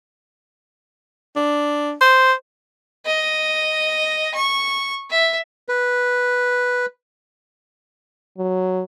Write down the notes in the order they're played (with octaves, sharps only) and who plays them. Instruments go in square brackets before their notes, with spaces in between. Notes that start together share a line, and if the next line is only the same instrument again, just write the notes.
[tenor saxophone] D4
C5
[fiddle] D#5
C#6
E5
[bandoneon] B4
[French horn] F#3